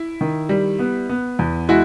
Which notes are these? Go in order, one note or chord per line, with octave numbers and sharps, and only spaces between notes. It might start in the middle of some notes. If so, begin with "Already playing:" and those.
Already playing: E4
D#3
G3
B3
B3
E2
G#3 E4 F#4